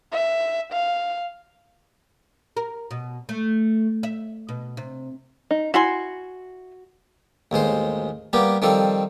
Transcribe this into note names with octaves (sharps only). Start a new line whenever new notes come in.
E5
F5
A#4
B2
A3
E5
B2
C3
D#4
E4 F#4 G#5 C6
A1 D#2 G#3 C5
G3 A#3 B3 G4
D#3 F3 G3 C4 A4